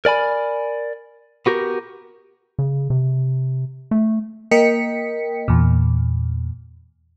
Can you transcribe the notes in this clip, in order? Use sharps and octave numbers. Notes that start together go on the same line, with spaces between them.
A#4 D5 G#5 B5
B3 F#4 G4 A#4
C#3
C3
A3
A#3 A#4 D#5 G5 B6 C#7
E2 A#2